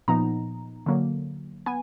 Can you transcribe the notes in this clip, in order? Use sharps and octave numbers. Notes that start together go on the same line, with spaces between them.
A#2 F3 B3 D#4 A#5
D3 F#3 A#3
B3 G#5